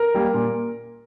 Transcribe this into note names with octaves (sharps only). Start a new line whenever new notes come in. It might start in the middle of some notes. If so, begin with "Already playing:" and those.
Already playing: A#4
G3 A#3
A#2